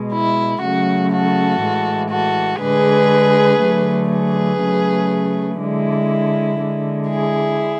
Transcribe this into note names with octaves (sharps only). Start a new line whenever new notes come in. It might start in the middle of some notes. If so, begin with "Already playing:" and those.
Already playing: B2 G#3
E4
C#3 F#3 A3 F#4
F#4 A4
A2 E3 G#3
F#4 A4
D3 G#3 G#4 B4
D3 F#3 A3
G#4 B4
C#3 F#3 A3
D3 G#3 E4
D3 G#3
E4 G#4